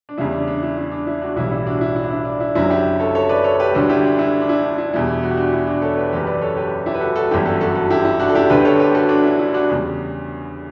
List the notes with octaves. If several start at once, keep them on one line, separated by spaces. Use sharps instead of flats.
D4
E2 C#3 G3 E4
D4
D4
E4
E4
D4
E4
D4 F#4
B1 A2 E3 G3 E4
E4
D4 F#4
E4
E4
D4
E4
D4
E4
F#1 F#2 D3 F#3 E4
E4 G4
A4 C#5
A4 C#5
B4 D5
A4 C#5
G4 B4
D2 D3 G3 F#4 A4
E4 G4
D4
E4
D4
E4
D4
E4
E2 B2 G3 E4
F#4
G4
D4 F#4
E4
D4 F#4
A4 C#5
G4 B4
F#1 F#2 E3 G4 B4
B4 D5
A4 C#5
G4 B4
E4 G4
B4
F#4 A4
F#4 A4
G1 F#2 E3 G3 E4 G4
F#4 A4
F#4 A4
F#4 A4
E4 G4
E4
D4 F#4
A4
E4 G4
D2 D3 A3 G4 B4
A4 C#5
G4 B4
F#4 A4
D4 F#4
E4
E4
D4 F#4
E2 C#3 G3